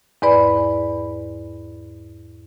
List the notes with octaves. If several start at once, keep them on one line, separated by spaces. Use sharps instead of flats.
E2 G#2 B4 D5 B5